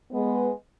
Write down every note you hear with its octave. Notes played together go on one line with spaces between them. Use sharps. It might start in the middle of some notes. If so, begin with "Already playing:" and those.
G#3 B3